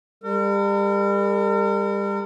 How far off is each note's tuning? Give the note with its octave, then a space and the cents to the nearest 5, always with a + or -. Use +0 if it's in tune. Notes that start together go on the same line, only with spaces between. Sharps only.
G3 +35 A#4 -40